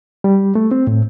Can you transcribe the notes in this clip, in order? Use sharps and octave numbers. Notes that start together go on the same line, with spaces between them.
G3
A3
C4
A2